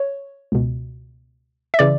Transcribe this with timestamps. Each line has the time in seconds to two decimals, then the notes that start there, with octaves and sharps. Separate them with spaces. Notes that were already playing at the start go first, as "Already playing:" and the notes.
Already playing: C#5
0.52 C#2 B2
1.74 E5
1.79 C#3 E3 D5